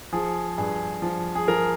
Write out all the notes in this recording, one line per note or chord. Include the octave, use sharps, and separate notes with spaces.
F3 G#4
G2 G#4
F3
G#4
F3 A#4